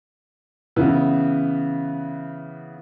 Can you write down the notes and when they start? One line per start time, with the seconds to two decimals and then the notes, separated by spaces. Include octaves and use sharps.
0.76 C#3 E3 B3